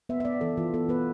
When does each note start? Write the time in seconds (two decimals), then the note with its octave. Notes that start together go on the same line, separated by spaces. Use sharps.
0.09 B3 E5
0.20 E5
0.25 B3 D5
0.41 E3 A4
0.57 E3 F4
0.74 B3 A4
0.89 B3 B4